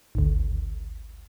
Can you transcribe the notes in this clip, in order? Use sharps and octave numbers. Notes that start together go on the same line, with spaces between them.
G#1 D2